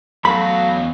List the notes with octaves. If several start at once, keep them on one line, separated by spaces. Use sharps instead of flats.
E2 F#3 A3 F#4 A4 F5 B5